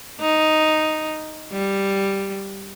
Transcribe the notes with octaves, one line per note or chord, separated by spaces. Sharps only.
D#4
G3